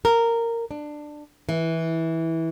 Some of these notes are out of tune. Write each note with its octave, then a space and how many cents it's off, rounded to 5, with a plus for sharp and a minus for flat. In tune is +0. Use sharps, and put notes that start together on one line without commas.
A#4 -10
D4 +15
E3 -15